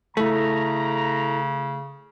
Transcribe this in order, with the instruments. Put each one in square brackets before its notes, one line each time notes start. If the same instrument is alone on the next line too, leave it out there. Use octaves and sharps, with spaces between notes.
[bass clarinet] C#3 [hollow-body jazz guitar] A3 [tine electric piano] E4 A4 [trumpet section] A#5